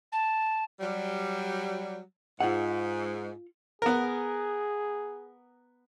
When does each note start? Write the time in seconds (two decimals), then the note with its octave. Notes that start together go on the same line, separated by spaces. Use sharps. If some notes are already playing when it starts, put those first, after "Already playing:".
0.12 A5
0.80 F#3 G3
2.40 G#2 F4 F#5
3.82 B3 G#4 A#4